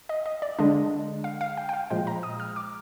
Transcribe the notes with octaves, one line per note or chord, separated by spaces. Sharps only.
D#5
D#5
D5
D3 G#3 D4 D#5
F5
F5
G5
G5
F5
A#2 F3 G#3 G5
A#5
D#6
F6
D6